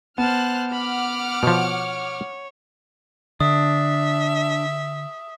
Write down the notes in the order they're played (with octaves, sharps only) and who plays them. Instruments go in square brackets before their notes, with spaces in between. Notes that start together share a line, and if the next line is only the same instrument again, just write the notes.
[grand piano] B3 [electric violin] C5 A5 [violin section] F6 F#6
[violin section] F#5 D6 F6 [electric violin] B5
[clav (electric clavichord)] B2 F3 [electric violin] C#5
[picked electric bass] D3 [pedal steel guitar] D4 [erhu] E5 [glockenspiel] D#6